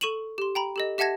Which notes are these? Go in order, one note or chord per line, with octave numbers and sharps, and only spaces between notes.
A4 C#6 D#7 E7 F#7
G4 C6
G5 A#5 B5
G4 A4 D#5
G4 E5 F#5 A5 G#6 A#6